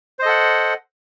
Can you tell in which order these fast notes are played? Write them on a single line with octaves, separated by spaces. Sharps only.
C5 D#5 A4 F#5